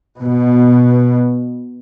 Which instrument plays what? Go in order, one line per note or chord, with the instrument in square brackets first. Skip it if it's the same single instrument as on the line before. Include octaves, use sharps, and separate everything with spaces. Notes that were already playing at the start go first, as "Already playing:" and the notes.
[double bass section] B2